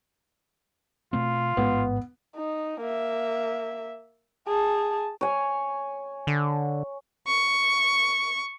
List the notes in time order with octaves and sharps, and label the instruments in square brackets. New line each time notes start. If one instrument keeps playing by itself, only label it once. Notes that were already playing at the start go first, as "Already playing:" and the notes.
[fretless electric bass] B2 A3 C4 [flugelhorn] F4
[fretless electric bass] A1 G#2 G#3 [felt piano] B3
[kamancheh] D#4
A#3 E5
G#4 A5
[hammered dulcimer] C#5 G#5
[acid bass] D3
[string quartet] C#6